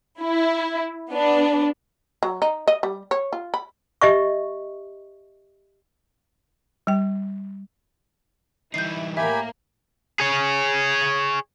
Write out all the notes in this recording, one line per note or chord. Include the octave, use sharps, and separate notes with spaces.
E4
B3 D4
F#3
D#4
D#5
G3
C#5
F4
B5
G4 D#5 E5 C#6
G3 G5
E3 G3 D#4 E4 G6 C7
A2 A#3 G4 E5 G#5 B5
G#4 C#5